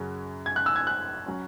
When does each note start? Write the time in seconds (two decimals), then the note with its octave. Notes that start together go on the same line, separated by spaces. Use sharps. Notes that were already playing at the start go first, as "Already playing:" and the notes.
Already playing: F#2 C#3 F#3 C#4
0.46 G#6
0.56 F#6
0.66 E6
0.76 G#6
0.87 F#6
1.26 F#3 C#4